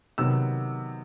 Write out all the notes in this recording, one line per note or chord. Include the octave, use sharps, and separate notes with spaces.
C3 D#3 F#3 B3 E6